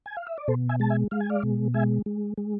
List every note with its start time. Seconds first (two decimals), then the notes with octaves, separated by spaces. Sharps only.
0.06 G#5
0.17 F5
0.27 E5
0.38 D5
0.48 B2 A4 C5
0.69 E5 G#5
0.80 G#3 A5
0.90 E5 G#5
1.11 G#3 F5
1.20 G#5
1.30 D5 F5
1.43 B2
1.74 G#3 E5 G#5
2.06 G#3
2.38 G#3